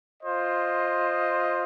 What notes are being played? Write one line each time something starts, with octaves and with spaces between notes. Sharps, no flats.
F4 C5 D#5